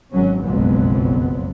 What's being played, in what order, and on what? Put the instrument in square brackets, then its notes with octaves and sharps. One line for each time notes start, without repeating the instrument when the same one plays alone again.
[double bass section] G#1 F#3 C#4
F#1 B1 F2 F#3 G#3 B3